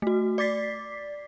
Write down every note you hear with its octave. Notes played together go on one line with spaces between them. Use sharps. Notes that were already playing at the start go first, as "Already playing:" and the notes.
A3 F#4
D5 D6 A6 B6 C7